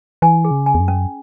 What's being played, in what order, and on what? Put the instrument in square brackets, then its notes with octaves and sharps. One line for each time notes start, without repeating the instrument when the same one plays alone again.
[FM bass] E3 [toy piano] G#5
[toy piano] G#4
[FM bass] C#3
[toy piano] G#5
[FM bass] E2
F#2
[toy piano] C#4